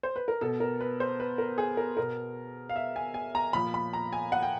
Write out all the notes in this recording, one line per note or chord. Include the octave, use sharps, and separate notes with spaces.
C5
B4
A#4
B2 A4
A#4
B4
C5
B4
A#4
G#4
A#4
B2 A#4
F5
E5
G#5
G#5
A#5
A#2 F3 B5
B5
A#5
G#5
F#5
G5